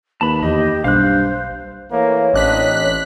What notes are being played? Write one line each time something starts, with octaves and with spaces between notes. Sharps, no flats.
D#2 B4 A5 B5
E2 G4 D#5
B1 G2 C5 F5 F#6
E3 A3 A#3 C#5
A1 C4 D4 D#5 F#6 B6